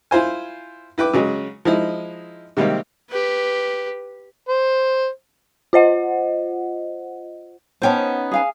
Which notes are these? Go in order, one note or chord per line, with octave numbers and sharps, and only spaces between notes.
E4 F4 C5 G#5
E4 B4 G5 D6
C#3 F#3 G#3
F3 G#3 D#4 E4
C3 D#3 G3 G#3 A#3 C4
G4 B4
C5
F4 C5 D#5 F#5
B3 C#4 D#4 C5 G5 A5
G#4 F5 G#5